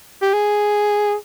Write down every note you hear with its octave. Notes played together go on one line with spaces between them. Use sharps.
G4
G#4